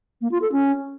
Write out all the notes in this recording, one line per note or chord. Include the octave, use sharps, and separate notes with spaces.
A#3
F4
A4
C#4